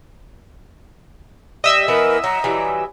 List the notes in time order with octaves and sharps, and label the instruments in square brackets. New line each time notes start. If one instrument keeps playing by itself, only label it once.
[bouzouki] G3 [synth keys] D#5 E5 E6
[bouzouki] E3 B3 B4 [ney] A#4
[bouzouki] F#3 [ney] A#5
[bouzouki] E3 F#3 G3